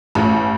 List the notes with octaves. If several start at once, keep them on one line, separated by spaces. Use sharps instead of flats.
A1